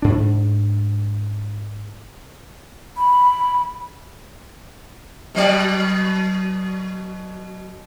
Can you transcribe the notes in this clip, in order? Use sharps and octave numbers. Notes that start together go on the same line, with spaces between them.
G#2 D4
B5
B2 F#3 D5